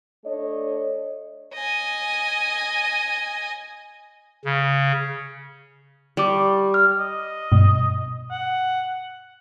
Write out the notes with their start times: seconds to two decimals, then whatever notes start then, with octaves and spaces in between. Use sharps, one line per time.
0.25 A3 D4 C#5 D#5
1.54 D#5 G#5
4.45 C#3
6.17 G3 G4 D6
6.74 F6
6.99 D#5
7.52 G2 B2
8.31 F#5